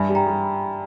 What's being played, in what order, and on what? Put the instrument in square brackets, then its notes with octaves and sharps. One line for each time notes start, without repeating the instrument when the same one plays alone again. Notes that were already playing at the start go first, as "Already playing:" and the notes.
Already playing: [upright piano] G2 [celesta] E5 G#5
[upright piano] G3
[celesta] G5 A#5
[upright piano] G3